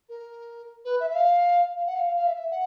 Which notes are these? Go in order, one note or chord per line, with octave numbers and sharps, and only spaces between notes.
A#4
B4
E5
E5
F5
F5
F#5
F5
F5
F5
E5
E5
F#5